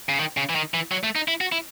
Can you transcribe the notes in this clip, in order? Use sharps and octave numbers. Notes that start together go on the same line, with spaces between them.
C#3
D#3
C#3
E3
D#3
E3
F#3
A3
D#4
E4
F#4
E4